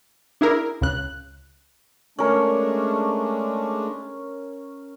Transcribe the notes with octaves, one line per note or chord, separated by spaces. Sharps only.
D4 E4 G#4 A#4
C#2 C#3 F#6
G#3 A3 C#4 D4 A#4